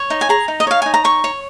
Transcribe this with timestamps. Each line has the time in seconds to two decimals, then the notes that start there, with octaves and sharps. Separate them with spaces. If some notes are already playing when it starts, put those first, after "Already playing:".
Already playing: C#5
0.10 D#4
0.21 G#5
0.29 G#4 A#5
0.48 D#4
0.60 D#5
0.67 C#5 F5
0.82 D#4 G#5
0.94 A#5
1.04 C#5 C#6
1.24 C#5